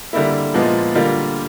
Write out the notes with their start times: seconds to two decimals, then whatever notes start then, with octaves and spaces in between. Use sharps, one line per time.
0.13 D3 G3 A#3 E4
0.54 A#2 F3 G#3 B3
0.95 D3 G3 A#3 F4